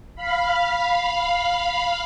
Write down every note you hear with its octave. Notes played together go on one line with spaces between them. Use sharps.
F5 B5